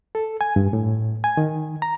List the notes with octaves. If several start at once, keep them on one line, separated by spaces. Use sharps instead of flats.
A4
G#5
G2
A2
G#5
D#3
A#5